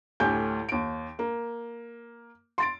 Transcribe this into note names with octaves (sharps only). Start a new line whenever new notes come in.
D2 A2 G4 G#5 G6
D#2 D7
A#3
C6 A6 D7